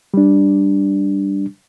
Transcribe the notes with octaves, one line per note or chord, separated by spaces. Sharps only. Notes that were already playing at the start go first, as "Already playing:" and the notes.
G3 D4